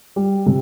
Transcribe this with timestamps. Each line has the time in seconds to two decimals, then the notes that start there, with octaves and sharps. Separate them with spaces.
0.16 G3
0.46 C3